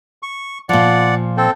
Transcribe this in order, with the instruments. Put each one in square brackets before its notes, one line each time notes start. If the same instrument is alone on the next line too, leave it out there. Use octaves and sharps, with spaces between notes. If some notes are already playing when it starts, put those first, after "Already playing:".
[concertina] C#6
[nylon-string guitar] A#2 F3 [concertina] D5 F#5
[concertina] C4 A4